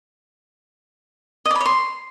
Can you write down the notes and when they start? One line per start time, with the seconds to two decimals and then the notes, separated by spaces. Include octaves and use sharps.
1.46 D#5
1.51 D5
1.56 B5
1.61 C#5
1.66 C6